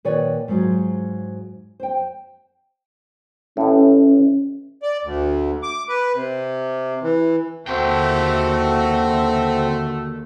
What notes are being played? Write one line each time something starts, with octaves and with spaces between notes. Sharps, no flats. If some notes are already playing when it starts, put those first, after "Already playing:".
A#2 D#3 B4 C#5 D5
G#2 F#3 G#3 F4
C5 G5
A1 A2 C#4
D5
D2
D6
B4
C3
E3
D#2 D3 A3 C4 F#4 G5